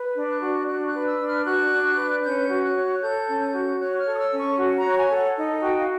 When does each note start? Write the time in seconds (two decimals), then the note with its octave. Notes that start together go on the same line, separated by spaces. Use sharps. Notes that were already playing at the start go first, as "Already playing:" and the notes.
Already playing: B4
0.16 D4
0.28 F#6
0.41 F#4
0.68 D4 F#6
0.87 F#6
0.93 B4
1.07 E6
1.19 D4
1.26 F6
1.45 F#4 F#6
1.71 D4
1.97 B4
2.24 C#4 G6
2.50 F#4
2.63 F#6
2.75 C#5
3.01 A4 G6
3.28 C#4
3.41 G6
3.54 F#4
3.80 C#5 F#6
3.99 F6
4.06 A4
4.14 D#6
4.19 E6
4.32 C#4
4.39 C#6
4.58 F#4
4.78 A#5
4.84 C#5
4.97 G#5
5.10 A4
5.17 F#5
5.37 D#4
5.62 F#4 G5
5.79 F5